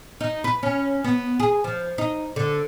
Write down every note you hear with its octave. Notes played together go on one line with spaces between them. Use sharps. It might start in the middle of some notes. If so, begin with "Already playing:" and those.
D#4
B4
C#4
B3
G#4
F3
D#4
D3